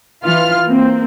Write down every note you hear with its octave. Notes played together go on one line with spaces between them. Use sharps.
E3 F4 F6
A#3 C4